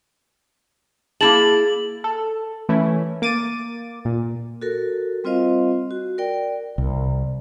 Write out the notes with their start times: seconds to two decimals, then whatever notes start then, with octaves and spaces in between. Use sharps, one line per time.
1.21 A#3 E4 G#4 A5 A6 F#7
2.04 A4
2.69 E3 A3 C#4 E4
3.22 A#3 D6 A6 D#7
4.05 A#2
4.62 F#4 A4 A#4
5.24 G3 C4 F4 C5 D#5 F5
5.91 F#4
6.18 A#4 D5 G5
6.78 C2